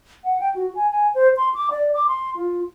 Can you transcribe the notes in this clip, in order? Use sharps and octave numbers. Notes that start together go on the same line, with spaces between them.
F#5
G5
F#4
G#5
G#5
C5
C6
D6
D5
D6
C6
F4